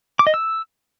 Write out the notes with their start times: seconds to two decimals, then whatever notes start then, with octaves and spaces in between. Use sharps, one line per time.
0.19 D6
0.27 D#5
0.34 E6